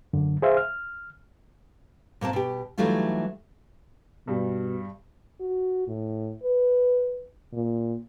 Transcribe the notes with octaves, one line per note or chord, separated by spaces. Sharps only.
F#2 D3
G#4 C5 E5 F5
F6
A#2 A#3 C4 A5
B2 G4
E3 F#3 G3 A3 D#4 F4
G2 B2 G3
F#4
A2
B4
A#2